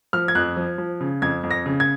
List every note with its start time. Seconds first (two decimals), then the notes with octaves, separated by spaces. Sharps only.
0.13 F3 F6
0.28 G#6
0.35 F2 F#6
0.57 F3
0.78 F3
1.01 C#3
1.22 F2 G#6
1.43 F2
1.51 A#6
1.66 C#3
1.80 G#6